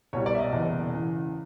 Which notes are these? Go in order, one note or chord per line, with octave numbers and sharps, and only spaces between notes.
C2 B2 G3 C#5
D5
E5
D#5
F#1 E2 B2
E2 C#3 E3